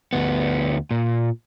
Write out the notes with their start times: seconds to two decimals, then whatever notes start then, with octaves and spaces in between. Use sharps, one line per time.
0.13 D2 B3
0.91 A#2